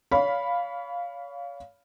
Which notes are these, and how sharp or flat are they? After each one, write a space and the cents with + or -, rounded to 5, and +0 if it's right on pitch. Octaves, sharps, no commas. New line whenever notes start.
C#5 +35 F5 +0 B5 +0